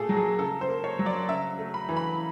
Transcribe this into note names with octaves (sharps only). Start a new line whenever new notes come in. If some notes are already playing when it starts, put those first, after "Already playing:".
Already playing: A#2 A3 G#4 A4
F#3
G#4
C#3 A4
C5
A#3
C#5
F#3
D5
C#3 E5
A3
B5
E3
B5